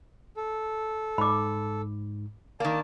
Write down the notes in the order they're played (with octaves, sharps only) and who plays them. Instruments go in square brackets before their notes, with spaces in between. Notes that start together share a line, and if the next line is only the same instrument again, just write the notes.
[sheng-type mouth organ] A4
[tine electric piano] G#2 [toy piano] B5 D6
[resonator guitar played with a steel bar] D#3 A#3 [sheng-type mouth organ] D5 A5